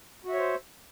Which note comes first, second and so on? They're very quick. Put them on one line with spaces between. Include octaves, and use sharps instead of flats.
F#4 E5 C#5 C5